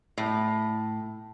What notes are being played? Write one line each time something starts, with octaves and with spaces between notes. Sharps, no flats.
A2